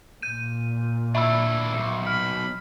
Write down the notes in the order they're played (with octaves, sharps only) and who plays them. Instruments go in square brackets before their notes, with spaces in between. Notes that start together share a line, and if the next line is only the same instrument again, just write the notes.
[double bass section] A#2 [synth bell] G6 D#7
[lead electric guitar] D4 E4 [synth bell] E5 B5 E6
[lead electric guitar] B1 F2
[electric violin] B5 [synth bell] F6